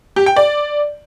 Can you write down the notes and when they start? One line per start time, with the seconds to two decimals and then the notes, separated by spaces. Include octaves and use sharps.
0.16 G4
0.26 G5
0.36 D5